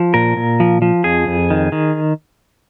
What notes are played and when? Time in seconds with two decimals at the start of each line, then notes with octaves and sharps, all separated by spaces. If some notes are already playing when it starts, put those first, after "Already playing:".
Already playing: F3
0.14 A#2 A#4
0.37 A#2
0.60 F3
0.82 F3
1.04 F2 G#4
1.28 F2
1.50 D#3
1.72 D#3